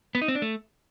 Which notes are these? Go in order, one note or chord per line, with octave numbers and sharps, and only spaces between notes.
B3
D#4
C4
D4
A3